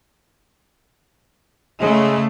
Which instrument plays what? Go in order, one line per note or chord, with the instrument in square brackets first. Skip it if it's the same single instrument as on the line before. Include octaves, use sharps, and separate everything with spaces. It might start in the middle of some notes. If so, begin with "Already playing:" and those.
[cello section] C#3 A3 [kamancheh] G#3